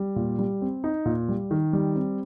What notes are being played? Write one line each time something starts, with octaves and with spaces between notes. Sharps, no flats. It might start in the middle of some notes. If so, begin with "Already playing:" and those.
Already playing: G3
A#2
G3
C4
D#4
A#2
G3
D#3
G3
C4